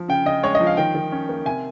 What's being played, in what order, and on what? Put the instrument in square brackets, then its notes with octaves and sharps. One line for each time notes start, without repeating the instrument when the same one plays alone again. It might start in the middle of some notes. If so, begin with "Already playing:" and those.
Already playing: [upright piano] F3
C#3 G5
C#3 D#5
G#3 C#5
D#5
F3
F5
D#3 G5
D#3
C#4
A#3
C3 G#5